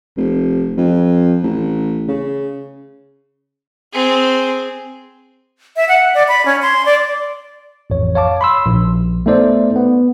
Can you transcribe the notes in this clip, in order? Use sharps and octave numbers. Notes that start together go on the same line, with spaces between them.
F1
F2
A1
C#3
C4 G#4
E5
F#5
D5
B5
C#4
C6
D5
A1 F2 C#5
C#5 F5 A5 D6
B5 C6 E6
A#1
A3 B3 D#4 A4 C5 D5
B3